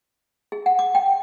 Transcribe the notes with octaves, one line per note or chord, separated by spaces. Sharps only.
G#4
F#5
D6
G5